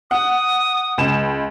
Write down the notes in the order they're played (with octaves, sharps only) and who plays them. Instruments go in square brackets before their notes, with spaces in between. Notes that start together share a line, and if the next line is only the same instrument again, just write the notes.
[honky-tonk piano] F#5 [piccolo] D#6
[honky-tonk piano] C#2 E7